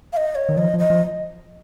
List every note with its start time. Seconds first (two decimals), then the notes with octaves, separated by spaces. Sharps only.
0.13 F5
0.17 D#5
0.35 C#5
0.49 D#3
0.57 F3 D#5
0.74 F3
0.79 D#5
0.90 F3